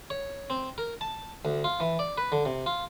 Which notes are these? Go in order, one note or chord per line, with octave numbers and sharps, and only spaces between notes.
C#5
C4
A#4
A5
D2
F4
E3
D5
B4
D3
C3
F4